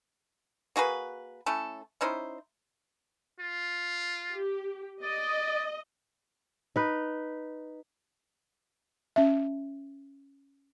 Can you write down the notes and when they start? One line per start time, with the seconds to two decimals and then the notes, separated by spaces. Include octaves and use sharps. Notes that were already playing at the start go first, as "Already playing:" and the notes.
0.76 A#3 F#4 G#4 B4
1.46 A3 C#4 E4 A4
2.01 C#4 D#4 E4 C5
3.40 F4
4.32 G4
5.03 D5 D#5
6.76 D#4 B4
9.16 C#4 E5